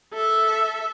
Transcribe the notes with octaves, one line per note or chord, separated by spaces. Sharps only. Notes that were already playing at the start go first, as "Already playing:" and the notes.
A4 E5